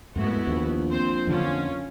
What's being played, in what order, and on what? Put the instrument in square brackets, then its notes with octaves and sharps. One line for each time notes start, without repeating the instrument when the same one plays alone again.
[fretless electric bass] F2 G#2 A3 [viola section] B3 E4 F#4
[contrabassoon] A#1 [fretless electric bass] D#2
[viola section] C4 C5
[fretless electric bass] F2 D3 F3 [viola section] C#4 F4